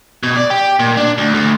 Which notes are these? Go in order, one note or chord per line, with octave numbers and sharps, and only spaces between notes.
B2
D5
G4
A#2
D4
D2
D2